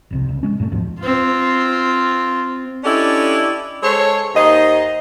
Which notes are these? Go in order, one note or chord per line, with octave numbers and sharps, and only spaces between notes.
F1 C2 C3
C#2
D1 G#2 G#3 C#4
F#2 A#2 G#3 A3
D2 G#2 B2 F3
C4 F4
C#4 D4 E4 G4 A4 D#5
G#3 A4 C5 C#5
D#2 D#4 C5 D#5